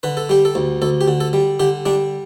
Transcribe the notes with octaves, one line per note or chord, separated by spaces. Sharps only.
D3 B4
A4
G3 G4
A4
D2
D2 A4
G4
D3
A4
G3
D3 G4
G3 D4